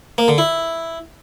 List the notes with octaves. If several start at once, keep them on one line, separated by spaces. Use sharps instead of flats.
A#3
D3
E4